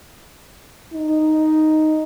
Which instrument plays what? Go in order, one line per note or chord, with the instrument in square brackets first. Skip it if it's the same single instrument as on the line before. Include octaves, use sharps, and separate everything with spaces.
[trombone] D#4